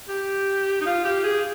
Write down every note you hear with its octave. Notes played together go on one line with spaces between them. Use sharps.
G4
D#4
F4
G4
G#4